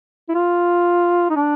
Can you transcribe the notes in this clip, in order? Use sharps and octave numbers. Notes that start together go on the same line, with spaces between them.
E4
F4
D#4
D4